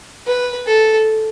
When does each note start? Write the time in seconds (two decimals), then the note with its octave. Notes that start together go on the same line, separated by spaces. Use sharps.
0.27 B4
0.67 A4